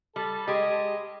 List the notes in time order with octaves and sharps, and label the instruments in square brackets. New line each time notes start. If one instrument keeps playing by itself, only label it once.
[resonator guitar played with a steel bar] G3 [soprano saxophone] A4
[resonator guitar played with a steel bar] G#3 G4 [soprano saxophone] D#5